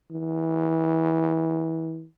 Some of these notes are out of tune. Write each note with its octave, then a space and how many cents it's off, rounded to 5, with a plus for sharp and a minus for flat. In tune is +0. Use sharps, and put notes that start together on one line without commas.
E3 -25